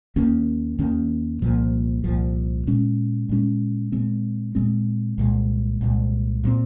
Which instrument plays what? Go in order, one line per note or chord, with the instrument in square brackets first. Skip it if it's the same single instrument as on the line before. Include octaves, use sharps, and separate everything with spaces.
[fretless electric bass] D#2 D#3 A#3 C#4
D#2 D#3 A#3 C#4
C2 A#2 F3
C2 A#2 F3
A#2 G#3 C#4
A#2 G#3 C#4
A#2 G#3 C4
A#2 G#3 C4
C2 A#2 G#3
C2 A#2 G#3
A#2 G#3 C4